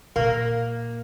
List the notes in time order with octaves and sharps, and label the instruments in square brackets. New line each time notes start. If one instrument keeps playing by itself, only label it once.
[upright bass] A#2 [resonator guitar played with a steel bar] A#3